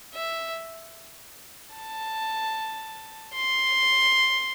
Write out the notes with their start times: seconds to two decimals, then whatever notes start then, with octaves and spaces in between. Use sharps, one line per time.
0.15 E5
1.75 A5
3.34 C6